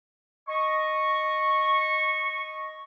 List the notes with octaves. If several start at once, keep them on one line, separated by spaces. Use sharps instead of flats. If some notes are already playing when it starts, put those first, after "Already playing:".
D#5 C#6